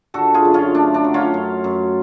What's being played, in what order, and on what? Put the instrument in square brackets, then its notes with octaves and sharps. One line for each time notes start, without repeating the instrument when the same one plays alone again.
[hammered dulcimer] D3 F#4 A4
F4 G#4
F#2
C#4 F4
A3 D4
D4
F#3
C#4 F4
F#2
F#2